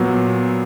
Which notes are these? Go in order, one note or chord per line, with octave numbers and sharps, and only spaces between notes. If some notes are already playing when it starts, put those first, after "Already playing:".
Already playing: A#2 F#3 B3